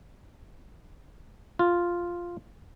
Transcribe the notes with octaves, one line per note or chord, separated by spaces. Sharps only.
F4